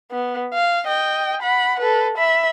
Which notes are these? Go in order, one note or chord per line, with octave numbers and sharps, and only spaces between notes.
B3
F5
D#5 G5
F#5 B5
A4 B4
E5 B5